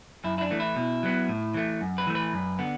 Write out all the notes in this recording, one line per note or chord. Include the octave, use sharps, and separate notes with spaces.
F#2 E4
E4
D4
E3 A3
E4
B2
F#3 B3
A2
E3 A3
F#2
B4
E3 A3
B4
F#2
D3 B3